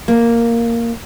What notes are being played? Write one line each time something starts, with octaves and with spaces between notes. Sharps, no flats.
A#3